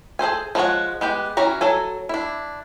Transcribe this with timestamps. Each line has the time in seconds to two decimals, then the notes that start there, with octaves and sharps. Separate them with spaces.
0.19 G#4 A4 C5 G#5
0.55 F3 G#3 E4 C#5 F#5
1.01 G#3 B3 G4 G5
1.37 E3 C#4 F#4 C#5 A#5
1.61 F#3 A4 G#5
2.09 D4 E4